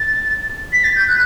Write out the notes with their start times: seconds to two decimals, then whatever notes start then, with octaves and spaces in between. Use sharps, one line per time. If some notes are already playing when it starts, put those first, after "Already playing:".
Already playing: A6
0.72 B6
0.83 A6
0.95 G6
1.08 F#6